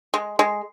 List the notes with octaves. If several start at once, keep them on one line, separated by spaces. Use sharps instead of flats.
G#3
G#3